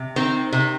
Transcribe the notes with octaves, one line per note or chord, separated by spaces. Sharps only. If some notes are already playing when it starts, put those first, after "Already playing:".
Already playing: C3
D#3 C4
C3